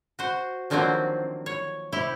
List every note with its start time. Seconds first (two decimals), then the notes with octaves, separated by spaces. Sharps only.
0.19 F#4 C5
0.70 D3 D#3 F3 F#3 A#3 C4
1.46 C#5
1.92 C3 E4 G4 G5